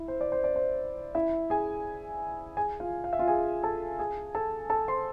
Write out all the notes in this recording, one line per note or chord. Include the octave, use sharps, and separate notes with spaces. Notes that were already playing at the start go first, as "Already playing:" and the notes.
Already playing: E4 E5
C5
D5
C5
D5
C5
E4 E5
G#4 G#5
G#4 G#5
F4 F5
F5
E5
F4 F5
G#4 G#5
A4 A5
G#4 G#5
A4 A5
A4 A5
C5 C6